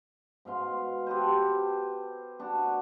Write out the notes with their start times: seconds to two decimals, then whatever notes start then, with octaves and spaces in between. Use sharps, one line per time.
0.45 G#2 B2 F5 C6
1.07 G4 A4 B4 C5
2.39 B3 D4 F#4